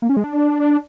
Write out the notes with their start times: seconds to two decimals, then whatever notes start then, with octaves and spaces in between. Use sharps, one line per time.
0.02 A#3
0.09 C#4
0.17 G#3
0.24 D4